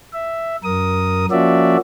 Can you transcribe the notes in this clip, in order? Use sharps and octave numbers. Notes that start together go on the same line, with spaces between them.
E5
F#2 A#4 D#6
F3 A#3 C#4 F#4 D5 E5